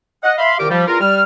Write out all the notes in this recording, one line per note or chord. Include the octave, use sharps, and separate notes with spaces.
D#5 F#5
E5 F5 B5 C6
C2 A#2 D#3 G4 A#4 D6
F3 G3
E2 F4 A#4 A#5
G3 F6